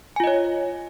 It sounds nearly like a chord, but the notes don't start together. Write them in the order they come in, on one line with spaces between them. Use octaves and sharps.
G#5 F4 D#5 C#5